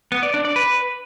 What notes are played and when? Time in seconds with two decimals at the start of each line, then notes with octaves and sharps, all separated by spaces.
0.12 B3
0.23 D5
0.34 D4
0.45 D5
0.56 B4